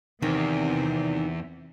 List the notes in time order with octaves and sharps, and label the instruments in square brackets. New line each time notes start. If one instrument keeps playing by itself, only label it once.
[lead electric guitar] E2 [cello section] C3 C4 [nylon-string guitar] D#3